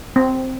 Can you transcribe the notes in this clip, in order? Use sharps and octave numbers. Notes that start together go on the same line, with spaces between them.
C4